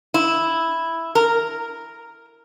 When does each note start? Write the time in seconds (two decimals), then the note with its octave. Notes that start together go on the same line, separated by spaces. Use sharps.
0.14 E4
1.15 A#4